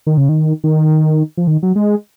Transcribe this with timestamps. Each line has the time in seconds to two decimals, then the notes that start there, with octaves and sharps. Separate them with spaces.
0.07 D#3
0.17 C#3
0.29 D#3
0.64 D#3
1.37 F3
1.47 D#3
1.63 F#3
1.76 G#3